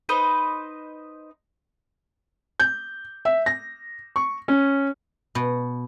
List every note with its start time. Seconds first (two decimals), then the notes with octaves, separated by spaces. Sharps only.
0.09 D#4 B4 C5 D#5
2.60 G6
3.25 E5
3.46 A#6
4.16 C#6
4.48 C#4
5.35 B2